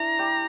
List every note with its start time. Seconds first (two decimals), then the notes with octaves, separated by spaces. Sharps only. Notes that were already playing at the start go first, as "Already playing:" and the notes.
Already playing: D4 E4 A#5
0.19 G3 G4